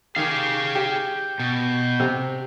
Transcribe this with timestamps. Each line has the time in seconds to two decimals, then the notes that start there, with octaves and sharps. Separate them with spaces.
0.16 D#3 G4 G#4 F5
0.75 G4 G6
1.40 B2
2.00 C3